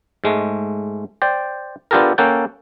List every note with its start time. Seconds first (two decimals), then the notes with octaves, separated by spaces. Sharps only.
0.24 G#2 G#3 A3
1.22 C5 D5 G5
1.91 B3 D4 F4 G4 A4 A#4
2.18 A#3 C#4 A4 F#5 G5